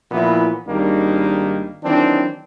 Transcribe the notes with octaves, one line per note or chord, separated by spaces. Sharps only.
A#2 E3 F3 B3 E4
G#1 D#3 G3 A#3 D4
D#3 E3 F#3 C4 D4